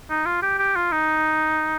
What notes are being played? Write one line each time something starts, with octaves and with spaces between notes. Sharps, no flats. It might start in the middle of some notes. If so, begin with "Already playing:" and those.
D#4
F4
G4
G4
F4
D#4